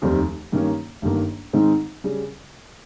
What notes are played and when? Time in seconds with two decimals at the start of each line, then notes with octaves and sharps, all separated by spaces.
0.02 F1 D#2 D#3 G3 C4
0.52 G2 D#3 A#3 C#4
1.02 G1 G2 D#3 A#3
1.53 G#2 D#3 G#3 C4 D#4
2.04 C#3 G3